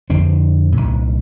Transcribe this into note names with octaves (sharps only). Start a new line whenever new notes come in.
F2 D3 C4 D4
C2 A#2